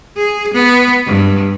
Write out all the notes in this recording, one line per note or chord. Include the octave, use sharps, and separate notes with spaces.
G#4
B3
G2